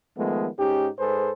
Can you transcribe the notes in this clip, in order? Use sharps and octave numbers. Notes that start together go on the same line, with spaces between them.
D#3 F3 G#3 A3 B3
G#2 C#4 D#4 G4
G#2 G#4 A4 B4 C5